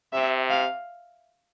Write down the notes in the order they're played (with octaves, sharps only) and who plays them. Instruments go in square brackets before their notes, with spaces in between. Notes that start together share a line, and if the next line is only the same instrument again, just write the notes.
[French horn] C3 [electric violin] E5
[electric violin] F5